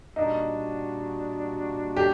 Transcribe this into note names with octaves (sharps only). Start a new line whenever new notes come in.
A#2 G3 D4 D#4 F#4
G4